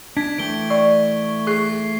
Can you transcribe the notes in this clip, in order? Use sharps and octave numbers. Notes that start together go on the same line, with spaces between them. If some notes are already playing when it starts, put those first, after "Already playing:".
D4 G#6 B6
E3 A3 G5 D7 G7
D5 C#6
G#4 C#6 C7